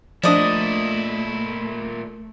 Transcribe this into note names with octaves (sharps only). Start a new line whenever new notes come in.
A#2 F3 A3 D4 E4 D5 D#5